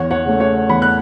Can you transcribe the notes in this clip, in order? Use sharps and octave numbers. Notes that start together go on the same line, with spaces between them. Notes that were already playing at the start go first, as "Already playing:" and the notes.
Already playing: E2 C#5 F#5
C#5 F#5
C#3 A3
C#5 F#5
E2 F#5 B5
F#6